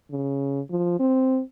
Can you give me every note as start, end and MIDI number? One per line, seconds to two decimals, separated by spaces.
0.11 0.61 49
0.70 0.98 53
0.99 1.41 60